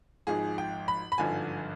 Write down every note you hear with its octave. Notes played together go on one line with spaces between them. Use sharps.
G#1 G#2 F3 G#4
G5
B5
B5
G#1 G2 D3 F3 G#5